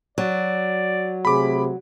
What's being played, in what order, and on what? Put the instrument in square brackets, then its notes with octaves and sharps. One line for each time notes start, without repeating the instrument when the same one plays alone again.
[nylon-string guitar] F#3 [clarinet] D5
[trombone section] C3 A3 G#4 [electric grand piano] B5 D6